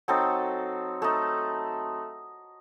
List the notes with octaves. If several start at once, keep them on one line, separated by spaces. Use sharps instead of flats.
F#3 C4 D#4 A4
A3 D#4 A4